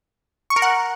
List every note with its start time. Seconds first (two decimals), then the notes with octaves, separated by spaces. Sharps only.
0.50 C#6
0.56 A#4
0.62 F#5